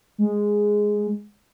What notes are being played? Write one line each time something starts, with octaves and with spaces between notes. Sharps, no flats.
G#3